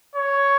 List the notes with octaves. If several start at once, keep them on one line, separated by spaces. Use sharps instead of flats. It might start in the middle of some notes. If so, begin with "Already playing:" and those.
C#5